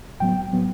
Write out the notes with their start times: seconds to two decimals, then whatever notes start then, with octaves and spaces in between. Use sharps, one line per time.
0.20 A2 F#3 B3 G5
0.53 A2 F#3 B3